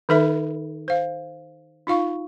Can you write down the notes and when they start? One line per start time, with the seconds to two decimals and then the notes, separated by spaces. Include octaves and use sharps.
0.09 D#3 D#4 A4 B4 E5 B5
0.88 C5 F5
1.87 D#4 F4 F5 C#6